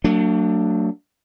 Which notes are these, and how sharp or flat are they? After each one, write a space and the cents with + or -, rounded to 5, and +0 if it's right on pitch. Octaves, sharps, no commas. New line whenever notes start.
F#3 +0 A3 +45 D4 +5